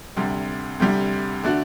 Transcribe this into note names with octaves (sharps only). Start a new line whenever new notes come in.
D2 C3 G3
D2 C3 G3
D3 A3 D4 F#4